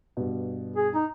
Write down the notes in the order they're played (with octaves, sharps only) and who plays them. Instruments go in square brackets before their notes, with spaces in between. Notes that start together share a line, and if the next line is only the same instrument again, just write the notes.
[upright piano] G2 B2
[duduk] G#4
D#4